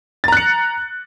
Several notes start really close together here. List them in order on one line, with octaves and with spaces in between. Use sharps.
A6 A#5 F#6 C#7